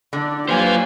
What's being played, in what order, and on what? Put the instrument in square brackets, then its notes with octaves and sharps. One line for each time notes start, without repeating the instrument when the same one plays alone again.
[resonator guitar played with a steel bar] D3 [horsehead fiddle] D4
[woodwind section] F#3 A#3 B4 [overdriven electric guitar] F4 C5 [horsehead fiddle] G4 G#5